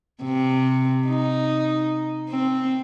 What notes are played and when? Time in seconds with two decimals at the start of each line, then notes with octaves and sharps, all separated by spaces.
0.23 C3
1.08 D#4
2.30 C4